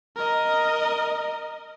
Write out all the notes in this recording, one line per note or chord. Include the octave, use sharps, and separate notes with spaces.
A#4 D#5